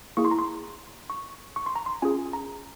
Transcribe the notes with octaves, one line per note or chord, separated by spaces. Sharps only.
A#3 E4 G#4 C#6
C6
A#5
C6
C#6
C#6
C6
A#5
C6
C#4 F4 G#4 G#5
A#5